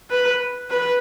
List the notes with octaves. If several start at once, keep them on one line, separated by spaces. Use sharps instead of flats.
B4
B4